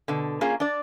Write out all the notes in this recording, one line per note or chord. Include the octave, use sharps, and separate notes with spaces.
B2 D3
A#3 C#4 F4 G#4
D4 D5